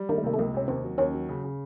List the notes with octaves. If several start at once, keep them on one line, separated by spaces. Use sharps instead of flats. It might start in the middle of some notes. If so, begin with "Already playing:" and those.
Already playing: G3
D#3 A#3
A3
C3 A#3
A3
C#2 A#3
C3 C#4
D#2 C4
F#3
D#2 C#4
F#3
C#3
C#3